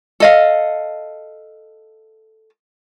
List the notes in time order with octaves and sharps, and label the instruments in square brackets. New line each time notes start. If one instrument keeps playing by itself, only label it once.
[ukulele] A4 D#5 F5